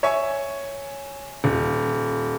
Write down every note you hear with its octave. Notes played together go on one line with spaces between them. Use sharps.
C#5 E5 G#5 C#6
D#1